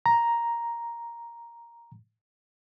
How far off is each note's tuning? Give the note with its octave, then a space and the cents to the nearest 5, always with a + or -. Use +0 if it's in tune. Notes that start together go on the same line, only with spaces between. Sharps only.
A#5 +5